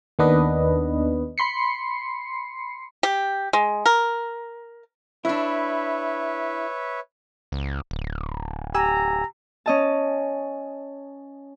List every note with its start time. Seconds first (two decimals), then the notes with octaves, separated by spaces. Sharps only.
0.19 D#2 D#3 B3 D4 B4 D#5
1.38 B5 C6 C7 C#7
3.03 G4
3.53 G#3
3.86 A#4
5.25 D4 E4 B4 C#5 E5
7.52 C#2
7.91 D1
8.75 G4 G#5 A#5 E6
9.66 C#4 D#5 A5